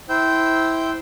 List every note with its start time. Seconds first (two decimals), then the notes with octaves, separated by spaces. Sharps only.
0.09 E4 C5 G5 E6 G6